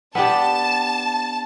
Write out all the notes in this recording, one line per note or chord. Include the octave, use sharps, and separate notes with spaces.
B3 D4 G4 A5